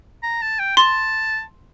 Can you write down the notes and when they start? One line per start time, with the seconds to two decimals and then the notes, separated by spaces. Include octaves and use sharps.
0.23 A#5
0.41 A5
0.59 G5
0.77 A5 C6